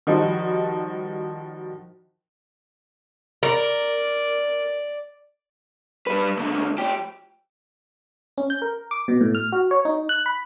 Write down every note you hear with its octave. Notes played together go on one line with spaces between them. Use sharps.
D#3 F3 G3 D#4 F#4
A#4 D5
G3 B4
C#2 D3
F3 G4
C#4
G6
A#4
D6
B2
A2
F6
F#4
C#5
D#4
F#6
B5